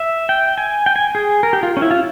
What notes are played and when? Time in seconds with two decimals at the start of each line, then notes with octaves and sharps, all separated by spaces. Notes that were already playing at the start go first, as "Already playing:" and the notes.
Already playing: E5
0.29 G5
0.58 G#5
0.86 G5
0.96 G#5
1.15 G#4
1.43 A#4
1.53 G4
1.63 F4
1.77 C#4
1.82 E4
1.91 F4